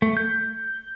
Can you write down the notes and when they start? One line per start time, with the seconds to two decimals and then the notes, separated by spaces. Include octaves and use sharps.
0.02 A3
0.17 G6